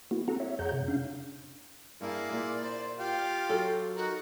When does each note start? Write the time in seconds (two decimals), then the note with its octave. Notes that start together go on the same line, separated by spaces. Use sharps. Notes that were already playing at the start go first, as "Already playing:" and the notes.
0.11 A#3 B3 E4 F#4
0.28 B3 C4 F#4 A4 F#5 A#5
0.40 C#5 E5
0.59 F2 G#4 C#5 F#5 A#5 G6
0.73 C3
0.88 C#4 D4 F5
2.01 G2 A#3 E4 G#4 D5
2.31 A#2
2.63 C5
2.99 F4 G4 F5
3.49 F#3 A4
3.96 D#4 F#4 A#4